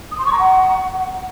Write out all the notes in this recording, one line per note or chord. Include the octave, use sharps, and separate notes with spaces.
D#6
C6
C#6
A#5
F#5